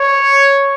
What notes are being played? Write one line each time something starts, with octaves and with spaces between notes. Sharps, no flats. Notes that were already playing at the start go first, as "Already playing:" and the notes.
Already playing: C#5